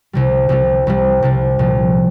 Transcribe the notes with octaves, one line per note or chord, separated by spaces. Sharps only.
C2 C3 G3
C2 C3 G3
C2 C3 G3
C2 C3 G3
C2 A#2 F3